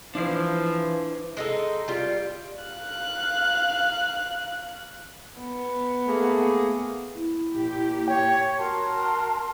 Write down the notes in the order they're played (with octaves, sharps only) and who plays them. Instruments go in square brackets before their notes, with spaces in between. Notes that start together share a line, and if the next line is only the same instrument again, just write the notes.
[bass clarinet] E3 [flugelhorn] F3 [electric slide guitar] D4 E4 C5
[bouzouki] G#3 D#4 A4
G3 F4
[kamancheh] F5 F#6
[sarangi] B3
[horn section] A3 A#3 G#4
[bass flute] E4
[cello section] A#2 G4
[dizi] C#5 [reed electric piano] G5
[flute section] F#4 A#4 A5 C6